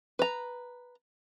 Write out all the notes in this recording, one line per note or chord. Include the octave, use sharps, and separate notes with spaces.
B4 A#5